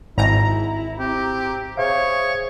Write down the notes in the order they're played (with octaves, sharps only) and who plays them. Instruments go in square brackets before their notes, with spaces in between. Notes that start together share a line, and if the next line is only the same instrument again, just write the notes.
[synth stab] G#1 A#5 [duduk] E4
[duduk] C4 [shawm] G4
[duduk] G#4 [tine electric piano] C5 E5 F5 [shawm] C#5